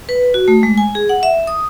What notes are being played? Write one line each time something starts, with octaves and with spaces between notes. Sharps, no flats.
B4
F#4
A3
G#3
G#5
G#4
F#5
E5
D#6